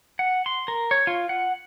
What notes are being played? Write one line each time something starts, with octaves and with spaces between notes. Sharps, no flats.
F#5
C6
A#4
C#5
F4
F#5